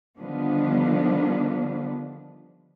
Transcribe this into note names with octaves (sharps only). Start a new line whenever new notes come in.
D3 D#3 F3 G3 B3 D4